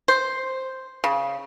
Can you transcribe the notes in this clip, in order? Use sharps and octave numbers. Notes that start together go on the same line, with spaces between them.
C5
C#3